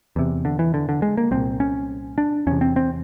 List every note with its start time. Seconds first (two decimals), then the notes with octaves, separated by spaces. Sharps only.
0.16 E2 C3
0.45 D3
0.59 E3
0.74 D3
0.89 D3
1.02 G#3
1.17 A#3
1.31 C2 A#2 C4
1.60 C#4
2.18 D4
2.47 E2 C3 C#4
2.61 C4
2.76 C4